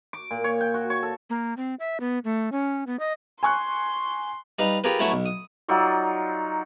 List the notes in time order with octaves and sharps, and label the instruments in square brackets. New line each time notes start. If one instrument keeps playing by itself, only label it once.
[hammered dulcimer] D6
A#2
C#5
G5
F#4
C#5
A4
[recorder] A#3
C4
E5
B3
A3
C#4
B3
D#5
[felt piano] G#5 C#6 F#6 [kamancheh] C6
[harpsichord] G3 D#4 B4 F5
F4 G4 G#4 A#4 B4
F#3 A3 C#4 E4 B4
B1
D#6
[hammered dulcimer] F#3 D#4 F4 D5